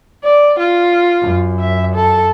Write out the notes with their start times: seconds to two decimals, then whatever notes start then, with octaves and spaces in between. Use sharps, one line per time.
0.24 D5
0.59 F4
1.22 F#2
1.60 E5
1.95 A4